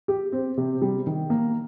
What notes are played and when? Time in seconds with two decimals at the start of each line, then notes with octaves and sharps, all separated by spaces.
0.08 G4
0.32 C4
0.57 C3
0.82 G3
1.07 D#3
1.30 A#3